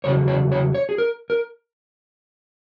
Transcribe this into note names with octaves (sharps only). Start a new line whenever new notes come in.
E2 C#3 F#3 C#5
C#5
C#5
C#5
G#4
A#4
A#4